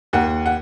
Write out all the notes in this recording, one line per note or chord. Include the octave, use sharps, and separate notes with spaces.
D#2 F#5
F#5